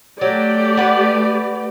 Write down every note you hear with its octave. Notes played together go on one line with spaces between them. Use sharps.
F#3 A3 G4 D5
B4 F#5